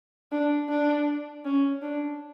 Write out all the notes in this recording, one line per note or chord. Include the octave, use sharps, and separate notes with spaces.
D4
D4
C#4
D4